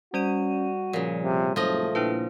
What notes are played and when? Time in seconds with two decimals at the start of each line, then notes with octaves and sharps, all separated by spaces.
0.14 G3 C#4 F#4 D5 D#7
0.93 A#2 C#3 F3
1.23 C3
1.56 F#1 F3 A3 D#5
1.95 A#2 D4 E4 B4